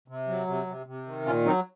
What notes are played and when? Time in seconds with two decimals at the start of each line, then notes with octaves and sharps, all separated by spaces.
0.08 C3
0.27 F#3
0.47 C3
0.67 C3
0.86 C3
1.06 D#3
1.25 A#2 C#4 F4
1.45 F#3 C4 D#4